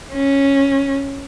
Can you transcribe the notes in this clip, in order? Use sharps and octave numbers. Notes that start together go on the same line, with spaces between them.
C#4